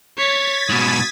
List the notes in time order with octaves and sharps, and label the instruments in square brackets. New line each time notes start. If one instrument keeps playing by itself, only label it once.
[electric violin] C#5 [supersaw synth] G#6 A6 B6
[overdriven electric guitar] G#2 B2 [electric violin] D#6